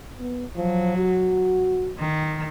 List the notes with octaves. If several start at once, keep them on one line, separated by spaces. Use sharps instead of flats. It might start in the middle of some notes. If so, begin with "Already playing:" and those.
B3
F3 F#3
F#4
D#3